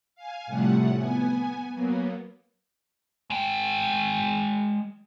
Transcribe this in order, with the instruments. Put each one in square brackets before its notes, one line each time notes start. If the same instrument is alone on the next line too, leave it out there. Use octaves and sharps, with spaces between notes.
[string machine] F5 G#5
A2 C3 F3 G3 A3 F#5
B3 G#5
F#3 A#3 B3
[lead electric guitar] G#3 G5